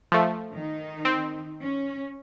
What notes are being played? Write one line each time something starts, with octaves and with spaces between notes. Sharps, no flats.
F3 A3
D#3 D#4
C4
C#4